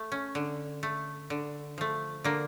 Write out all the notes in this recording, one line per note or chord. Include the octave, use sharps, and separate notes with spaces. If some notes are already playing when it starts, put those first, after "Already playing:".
Already playing: A3
C#4
D3
A3
D3
F3 A3
D3 A#3